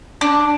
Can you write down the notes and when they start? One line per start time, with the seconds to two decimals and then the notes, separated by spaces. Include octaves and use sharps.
0.21 D4